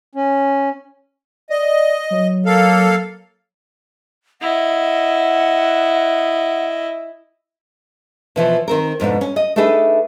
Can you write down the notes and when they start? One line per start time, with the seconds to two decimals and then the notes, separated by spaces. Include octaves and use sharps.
0.15 C#4
1.50 D5 D#5
2.11 F#3
2.46 A#3 A4 F5
4.41 E4 D#5 F#5
8.36 B2 E3 F3
8.68 D#3 C4 A#4
9.00 F2 G#2 B2 D4
9.21 C#4
9.36 D#5
9.56 A3 D4 D#4 G#4 A4 B4